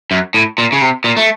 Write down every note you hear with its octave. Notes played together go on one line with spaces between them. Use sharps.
F#2
A2
A#2
C#3
C3
A#2
A3